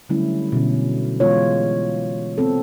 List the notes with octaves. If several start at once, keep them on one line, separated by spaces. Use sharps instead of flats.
D3 F#3 G3 A3 C#4 E4
B2 D3 C#4
E3 G#3 B3 F4 C#5
B3 C4 A4